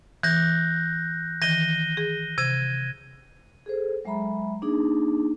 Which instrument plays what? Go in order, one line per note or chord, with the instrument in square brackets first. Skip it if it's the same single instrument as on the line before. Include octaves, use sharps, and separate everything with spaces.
[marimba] E3 [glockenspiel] F#6 G6 A#6
[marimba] D#3 E3 [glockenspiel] A#6 D#7 G7
[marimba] G#4
[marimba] C3 [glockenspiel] G#6 D#7
[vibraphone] G#4 A4 C5
F#3 G#3 E5 A#5 B5
A#3 D4 D#4 G#4